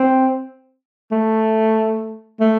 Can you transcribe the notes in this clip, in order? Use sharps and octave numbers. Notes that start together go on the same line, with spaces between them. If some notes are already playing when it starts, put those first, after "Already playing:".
Already playing: C4
A3
A3